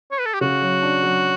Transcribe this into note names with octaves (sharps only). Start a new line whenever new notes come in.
C#5
B4
A4
G4
C#3 F#4
F#3
D4
F#3